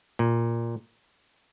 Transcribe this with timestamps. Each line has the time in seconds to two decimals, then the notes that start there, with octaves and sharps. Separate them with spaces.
0.19 A#2